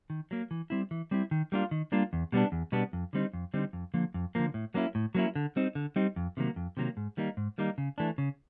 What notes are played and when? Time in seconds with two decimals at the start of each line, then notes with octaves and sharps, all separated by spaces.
0.10 D#3
0.31 F#3 A#3
0.51 E3
0.70 G3 C4 E4
0.91 E3
1.11 G3 C4 E4
1.31 D#3
1.52 G3 A#3 D4 F4
1.71 D#3
1.92 G3 A#3 D4 F4
2.13 E2
2.32 B2 G3 B3 D4
2.52 E2
2.72 B2 G3 B3 D4
2.93 F2
3.13 D3 G3 C4 D#4
3.33 F2
3.54 D3 G3 C4 D#4
3.73 F2
3.94 D3 F3 A#3
4.14 F2
4.35 D3 F3 A#3
4.54 A2
4.74 F#3 A#3 C#4 E4
4.95 A2
5.15 F#3 A#3 C#4 E4
5.35 D3
5.56 G3 C4 D#4
5.75 D3
5.96 G3 C4 D#4
6.16 F2
6.37 C3 D#3 F#3 A#3
6.56 F2
6.77 C3 D#3 F#3 A#3
6.97 G#2
7.17 D#3 G3 A#3 D#4
7.37 G#2
7.58 D#3 G3 A#3 D#4
7.78 C#3
7.98 E3 A3 D4
8.18 C#3